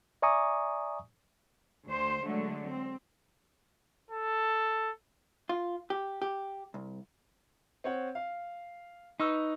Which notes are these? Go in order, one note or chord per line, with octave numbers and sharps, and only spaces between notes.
D5 E5 G#5 A#5 C#6 D#6
D2 C5
D3 F#3 G#3 A3
C4
A4
F4
G4
G4
C2
C4 C#5 F#5
F5
D#4 B4 C#6 E6